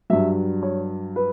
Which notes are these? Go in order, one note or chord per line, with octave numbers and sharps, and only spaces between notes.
G2 F#3 E5
C#5
B4